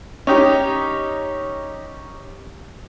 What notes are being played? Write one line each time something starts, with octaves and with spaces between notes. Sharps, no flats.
C#4 D#4 G4